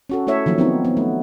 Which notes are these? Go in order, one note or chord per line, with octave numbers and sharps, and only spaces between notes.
C#4 F#4 A4
A3 E4 A4 C#5 E5
D#3 F3 F#3 A#3
B3 C4 D#4
B3
A3